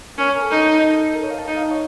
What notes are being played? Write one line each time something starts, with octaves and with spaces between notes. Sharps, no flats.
C#4 A#4
A#4
A4
D#4
A#4
C#5
F5
A5
D#4
F5
D#5
C#5